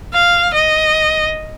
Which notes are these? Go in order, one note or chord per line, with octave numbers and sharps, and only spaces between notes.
F5
D#5